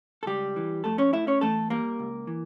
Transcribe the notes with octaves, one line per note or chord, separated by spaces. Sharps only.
A4
C#2 G3 G4
E3
F2 A3 A4
C#4 C#5
A3 E4 E5
C#4 C#5
E2 A3 A4
G3 A#3 A#4
C#2
E3